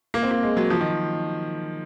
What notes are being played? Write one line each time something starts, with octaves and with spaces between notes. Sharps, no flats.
A#3
C4
A#3
G#3
F#3
F3
D#3